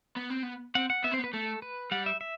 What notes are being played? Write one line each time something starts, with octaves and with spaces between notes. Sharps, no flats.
B3
C4
B3
C4 F#5
F#5
B3 E5
C4 C5
B3
B4
A3 A4
B4
G3 F#5
E5
E5